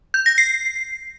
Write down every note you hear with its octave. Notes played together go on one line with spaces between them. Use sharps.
G6
A#6
C7